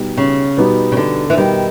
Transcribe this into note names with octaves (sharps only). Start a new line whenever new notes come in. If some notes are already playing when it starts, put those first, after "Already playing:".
Already playing: B2 G3 B3 D#4 G4
C#3
B2 G3 B3 D#4 G4
C#3
D3
E3
B2 D#3 G3 B3 D#4 G4